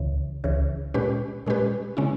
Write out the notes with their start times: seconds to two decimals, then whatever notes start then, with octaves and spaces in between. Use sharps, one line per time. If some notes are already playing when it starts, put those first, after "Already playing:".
Already playing: C#2 C#3 E3
0.44 C#2 C#3 E3
0.94 A#2 G#3 C#4 G4 B4
1.46 A#2 G#3 C#4 G4 B4
1.97 C#3 G#3 C#4 E4